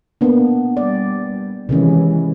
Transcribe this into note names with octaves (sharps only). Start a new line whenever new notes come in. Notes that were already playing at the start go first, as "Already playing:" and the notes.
A#3 B3 D4
G3 D5
C3 D#3 E3 G#3 C#4